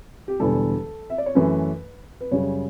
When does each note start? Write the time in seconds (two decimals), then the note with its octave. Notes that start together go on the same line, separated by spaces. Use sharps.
0.28 G4
0.40 E1 E2 D3 G3 A4
1.10 E5
1.18 D5
1.26 C#5
1.35 F#2 E3 A3 C#4 B4
2.21 B4
2.31 F#2 C#3 G3 C#4 C#5